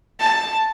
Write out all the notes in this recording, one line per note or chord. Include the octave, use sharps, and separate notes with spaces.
A5